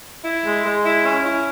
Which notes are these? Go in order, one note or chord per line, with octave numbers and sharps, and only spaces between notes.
E4
G#3
G#3
E4
C#4
E4